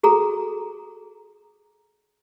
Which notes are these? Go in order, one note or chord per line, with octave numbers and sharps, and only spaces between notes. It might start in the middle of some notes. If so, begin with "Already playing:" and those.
F#4 G#4 A4 A#5